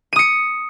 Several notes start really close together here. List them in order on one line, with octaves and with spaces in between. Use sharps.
D#7 D#6 C#7